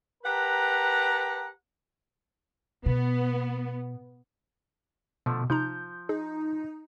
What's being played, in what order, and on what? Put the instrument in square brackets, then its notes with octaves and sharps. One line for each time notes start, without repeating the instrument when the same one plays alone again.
[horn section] G4 A#4 B4 F#5 A5 A#5
[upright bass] B2 [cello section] B3
[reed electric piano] B2 [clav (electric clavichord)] D3 F3 A3
[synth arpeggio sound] C3 D#4 A#5 [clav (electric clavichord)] F3 [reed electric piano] G6
[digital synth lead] D#4 [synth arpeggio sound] G#4